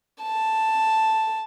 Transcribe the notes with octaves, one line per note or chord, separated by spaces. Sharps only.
A5